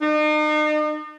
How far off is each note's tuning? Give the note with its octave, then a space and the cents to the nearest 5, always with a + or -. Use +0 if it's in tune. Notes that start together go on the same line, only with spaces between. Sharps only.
D#4 -40